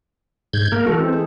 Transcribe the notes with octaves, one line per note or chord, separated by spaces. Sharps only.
G#2 G6 G#6
A#3 A#4
E3 G#3 F#4 A4 A#4
C4
G#4